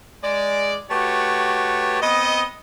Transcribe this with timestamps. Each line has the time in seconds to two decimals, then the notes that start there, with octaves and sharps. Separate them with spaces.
0.23 G#3 D5
0.90 A3 F#4 G4 B4 C#5
2.02 B3 C4 D#5